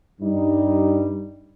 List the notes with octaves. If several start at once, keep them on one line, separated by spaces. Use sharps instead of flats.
G2 G3 D#4